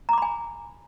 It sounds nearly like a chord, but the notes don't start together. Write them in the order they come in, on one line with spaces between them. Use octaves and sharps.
A#5 D6 B5 G#5